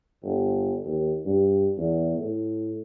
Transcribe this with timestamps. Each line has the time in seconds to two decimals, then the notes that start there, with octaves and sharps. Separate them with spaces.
0.23 G1
0.85 D#2
1.26 G2
1.78 E2
2.17 A2